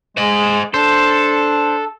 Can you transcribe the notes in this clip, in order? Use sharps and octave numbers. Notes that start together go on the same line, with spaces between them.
G#3 C5 D#5
D4 A4 C5